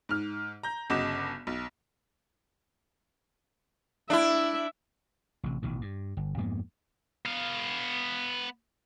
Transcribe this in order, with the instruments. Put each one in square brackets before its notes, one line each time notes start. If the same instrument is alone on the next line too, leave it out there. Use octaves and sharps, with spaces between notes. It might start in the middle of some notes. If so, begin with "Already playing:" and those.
[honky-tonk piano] G#2 F6
A#5 G6
G1 C#3 F#4 D#5 D6 E7
B1
[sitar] D4 E4 [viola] E5
[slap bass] A1 C3
A1 B2 D#3
G2
G1
F2 G#2 A#3 B3
[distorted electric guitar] B3 F5